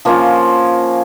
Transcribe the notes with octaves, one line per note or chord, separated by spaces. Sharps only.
F3 A#3 C#4 F4